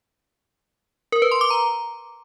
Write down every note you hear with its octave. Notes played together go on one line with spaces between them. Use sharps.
A#4
B4
C6
D6
A#5